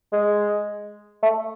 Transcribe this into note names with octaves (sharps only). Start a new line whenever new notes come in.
G#3
A3